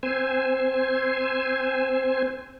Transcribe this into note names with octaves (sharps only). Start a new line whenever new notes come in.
C4 C5 G#5